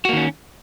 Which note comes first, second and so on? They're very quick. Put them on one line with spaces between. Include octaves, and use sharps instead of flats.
F#4 A#3 D#3 C#4